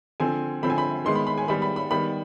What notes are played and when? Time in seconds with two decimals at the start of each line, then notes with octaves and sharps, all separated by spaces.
0.20 D3 F3 C4 G#5
0.63 D3 F3 C4 B5
0.70 G#5
0.78 B5
1.05 D#3 G#3 B3 C6
1.15 B5
1.27 B5
1.38 G#5
1.48 D#3 G3 B3 B5
1.62 B5
1.76 B5
1.91 D#3 G3 B3 B5